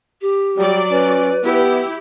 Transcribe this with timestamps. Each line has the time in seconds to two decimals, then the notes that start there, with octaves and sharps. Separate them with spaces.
0.22 G4
0.58 F#3 G3 D5
0.91 C#4 B4
1.44 B3 E4 G4